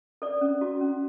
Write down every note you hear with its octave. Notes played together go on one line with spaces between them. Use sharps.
A4 D5
C#4
F#4
C#4